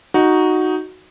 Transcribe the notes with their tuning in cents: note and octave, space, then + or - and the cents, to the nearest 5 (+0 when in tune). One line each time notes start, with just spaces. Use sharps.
D#4 +0 F#4 +0